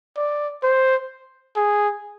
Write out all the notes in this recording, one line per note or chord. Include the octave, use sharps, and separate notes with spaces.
D5
C5
G#4